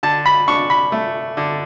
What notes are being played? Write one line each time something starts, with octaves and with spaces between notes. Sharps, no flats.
D3 A5
B5
D4 C#6
B5
A3
D3